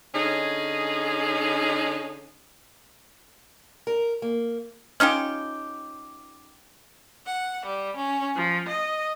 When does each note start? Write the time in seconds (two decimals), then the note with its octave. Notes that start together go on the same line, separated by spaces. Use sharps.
0.15 D3 C#4 D#4 G#4
3.87 A#4
4.22 A#3
5.00 C#4 D#4 F4 G4
7.26 F#5
7.65 G3
7.95 C#4
8.36 F3
8.69 D#5